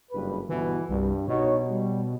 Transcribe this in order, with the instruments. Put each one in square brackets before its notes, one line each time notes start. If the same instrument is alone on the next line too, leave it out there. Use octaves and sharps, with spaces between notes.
[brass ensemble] F#1 G2 B4
[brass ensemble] G1 B2 B3 [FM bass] E3
[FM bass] C2 [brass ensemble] G2
[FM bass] B2 [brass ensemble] D#4 F#4 C#5
[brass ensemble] G3